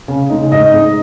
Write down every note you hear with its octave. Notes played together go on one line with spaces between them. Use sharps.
C#3
G#3 D#4
G#2 D#5
G#3 D#4